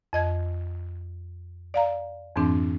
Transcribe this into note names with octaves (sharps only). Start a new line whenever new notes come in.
F2 D#5 G#6
D5 F5 A#5
F2 G#2 E3 C4 D4